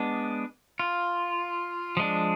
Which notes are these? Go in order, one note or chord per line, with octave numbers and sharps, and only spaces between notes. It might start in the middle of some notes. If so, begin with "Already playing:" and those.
Already playing: G#3 B3 D4
F4
F3 G#3 D4